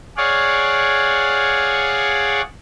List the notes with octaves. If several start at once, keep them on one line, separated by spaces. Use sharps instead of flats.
G#4 C#5 D5 F5 F#5